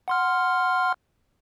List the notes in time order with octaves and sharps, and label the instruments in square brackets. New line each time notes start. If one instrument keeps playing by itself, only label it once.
[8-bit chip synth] F#5 C6 F6